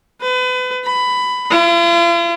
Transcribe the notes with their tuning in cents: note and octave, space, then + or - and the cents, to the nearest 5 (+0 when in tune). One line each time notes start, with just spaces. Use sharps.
B4 +35
B5 +15
F4 -45